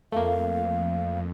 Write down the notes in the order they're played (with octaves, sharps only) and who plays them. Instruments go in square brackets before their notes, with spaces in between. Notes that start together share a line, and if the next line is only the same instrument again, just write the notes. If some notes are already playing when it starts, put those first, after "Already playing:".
[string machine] F2 [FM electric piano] A3 A#3 [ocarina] F5